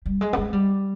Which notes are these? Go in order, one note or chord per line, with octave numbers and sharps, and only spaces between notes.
G3
G#3
B3
G#3
G3